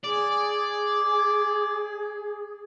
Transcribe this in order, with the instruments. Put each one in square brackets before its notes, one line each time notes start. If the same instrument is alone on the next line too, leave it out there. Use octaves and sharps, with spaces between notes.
[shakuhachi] G#4 [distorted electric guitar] D5